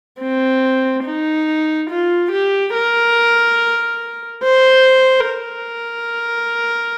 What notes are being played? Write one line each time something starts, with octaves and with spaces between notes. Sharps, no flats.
C4
D#4
F4
G4
A#4
C5
A#4